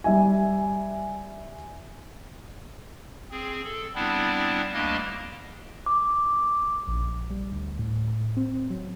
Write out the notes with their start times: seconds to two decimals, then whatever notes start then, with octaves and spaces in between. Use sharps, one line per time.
0.04 G3 E5 G#5
3.31 C4 G#4
3.64 A4
3.95 G3 B3 C4 D4 E4
4.74 D2 G3 A#3 D4 D#5
5.86 D6
6.88 A#1
7.30 G3
7.52 D2
7.79 A2
8.37 C4
8.70 F#3